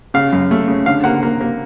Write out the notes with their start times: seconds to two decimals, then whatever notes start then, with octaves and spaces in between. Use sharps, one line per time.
0.14 C#3 F5
0.32 F#2
0.51 A3
0.68 C#3
0.86 D3 F5
1.04 A#3 F#5
1.23 A#3
1.41 A#3